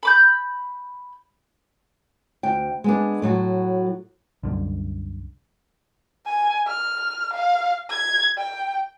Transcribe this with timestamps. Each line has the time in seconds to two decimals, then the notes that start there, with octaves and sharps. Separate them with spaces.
0.03 B5 D6 G6
2.43 D2 G5
2.84 G#3 B3 D4
3.22 A2 F#3 F#4
4.43 C2 F#2 D3
6.26 G#5
6.68 F6
7.33 F5
7.90 G#6
8.38 G5